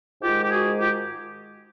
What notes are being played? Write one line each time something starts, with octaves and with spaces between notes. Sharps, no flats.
G#2 D#3 G#3 F4 G4
G4
F#4 G#4
F4 G4